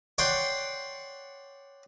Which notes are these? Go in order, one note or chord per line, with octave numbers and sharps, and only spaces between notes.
C#5 D5 F#5 G5 C6